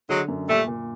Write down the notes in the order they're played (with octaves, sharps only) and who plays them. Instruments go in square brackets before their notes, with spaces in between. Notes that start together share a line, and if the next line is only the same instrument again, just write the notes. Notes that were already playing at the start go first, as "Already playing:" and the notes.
[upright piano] D3 [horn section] F#3 G#3
[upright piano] F#2
[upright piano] A#2 [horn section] G3 A3
[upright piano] A#2